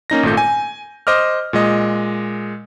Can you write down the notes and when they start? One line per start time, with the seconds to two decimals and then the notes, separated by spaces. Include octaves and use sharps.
0.10 A#3 C#4 D#4 A#6
0.23 G#1 A#2 A3 G6
0.37 G#5
1.07 C5 D#5 D6 F6
1.53 A#2 G#3 D#5